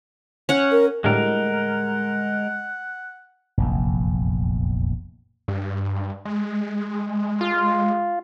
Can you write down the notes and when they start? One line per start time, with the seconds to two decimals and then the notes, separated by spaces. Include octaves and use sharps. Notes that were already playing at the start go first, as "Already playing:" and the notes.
0.49 C#4 F#5
0.71 A#4
1.04 A2 D3 G3 G#3 A#4 F#5
3.58 F1 A#1 E2
5.48 G2
6.25 G#3
7.41 F4